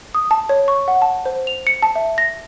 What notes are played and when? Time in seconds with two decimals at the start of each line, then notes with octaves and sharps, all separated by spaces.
0.15 D#6
0.31 A5
0.49 C#5
0.68 C#6
0.88 F#5
1.02 A5
1.26 C5
1.47 F7
1.67 C#7
1.82 A5
1.96 E5
2.18 A#6